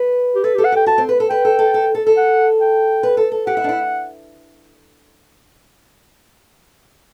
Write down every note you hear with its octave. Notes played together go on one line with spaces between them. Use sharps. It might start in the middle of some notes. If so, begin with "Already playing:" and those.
Already playing: B4
G4
A4 B4
G4
A4
F#5
G4 G5
F#4 A5
C4
B4
A4
B4 G5
A4
A4
A4
A4
A4
F#5
G5
B4
A4
A4
G4 F#5
E4
D4
E4